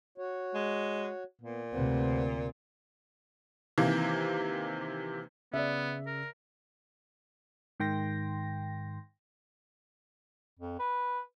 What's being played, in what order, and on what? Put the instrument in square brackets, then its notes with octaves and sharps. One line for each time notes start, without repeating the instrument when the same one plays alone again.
[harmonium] F#4 C#5
[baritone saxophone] G#3
[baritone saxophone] A#2 [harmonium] B3
[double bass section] D2 C3 C4 [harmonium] B4 C5 F#5
[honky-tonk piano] C3 D#3 E3 A#3
[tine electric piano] C#3 [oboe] B3 [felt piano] D5 E5
[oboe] A#4
[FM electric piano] G#2 D#3 G5 C6 A#6
[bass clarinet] F2
B4